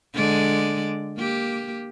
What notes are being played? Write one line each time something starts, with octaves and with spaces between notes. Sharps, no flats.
D3 G#3 D5
A#3 G4